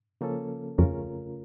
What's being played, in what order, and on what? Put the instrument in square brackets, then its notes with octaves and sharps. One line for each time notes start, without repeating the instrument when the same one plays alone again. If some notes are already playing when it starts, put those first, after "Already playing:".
[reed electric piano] C#3 F3 A#3 C#4 A4
[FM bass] F2 [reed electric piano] C#3 A3 C#4 F4 A#4